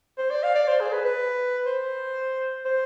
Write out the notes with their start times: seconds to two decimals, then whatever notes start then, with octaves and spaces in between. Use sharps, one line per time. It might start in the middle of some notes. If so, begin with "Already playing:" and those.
0.18 C5
0.31 D5
0.43 F5
0.55 D5
0.68 C5
0.80 G#4
0.93 B4
1.05 B4
1.66 C5
2.65 C5